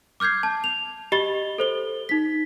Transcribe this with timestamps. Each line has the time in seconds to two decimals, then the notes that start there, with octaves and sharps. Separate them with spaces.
0.20 D6 F6 G6 G#6 C7
0.43 A5
0.64 F7
1.12 G4 D#5 B5 A6 G7
1.58 A4 C5 G7
2.09 D#4 B6